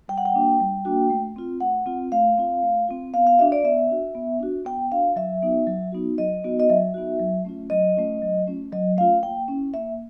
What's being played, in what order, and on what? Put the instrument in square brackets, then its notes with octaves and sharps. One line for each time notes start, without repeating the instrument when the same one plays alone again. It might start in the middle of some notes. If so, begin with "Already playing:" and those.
[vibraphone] G3 G5
F#5
G5
A#3 D4 F#4
G3
A#3 D4 F#4
A3
C4 F4
A3 F#5
C4 F4
A3 F5
C4 F4
A3
C4 F4
B3 F5
F5
D4 F#4 E5
D5
B3 E5
D4 F#4
B3
D4 F#4
B3 G5
D4 F#4 F5
F#3 E5
B3 D#4 F#4
F#3
B3 D#4 F#4
F#3 D#5
B3 D#4 F#4
D#5
F#3 E5
B3 D#4 F#4
F#3
A3 C#4 F4
F#3 D#5
A3 C#4 F4
F#3
A3 C#4 F4
F#3 D#5
A3 C#4 F4 F5
A#3 G5
C#4 E4
A#3 E5